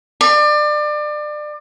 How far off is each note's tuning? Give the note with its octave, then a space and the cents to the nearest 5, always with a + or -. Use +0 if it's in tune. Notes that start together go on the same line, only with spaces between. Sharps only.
D5 +30